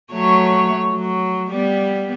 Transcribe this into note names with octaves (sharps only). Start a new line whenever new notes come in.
F#3 A3 C#5
F#3
G3 B3